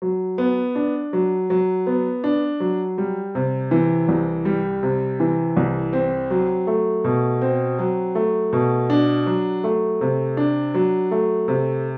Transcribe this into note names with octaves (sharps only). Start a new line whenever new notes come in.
F#3
B3
D4
F#3
F#3
B3
D4
F#3
G3
C3
E3
C2
G3
C3
E3
C2
C4
F#3
A3
B2
C4
F#3
A3
B2
D4
F#3
A3
C3
D4
F#3
A3
C3